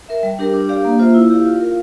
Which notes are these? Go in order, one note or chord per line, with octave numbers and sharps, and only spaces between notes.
A#4 E5
G3
D4 G4 A#4
D4
G4 D5 F5
A#3
F4 C5 E5
E4
G4 D5 F5
F4
A#4 F5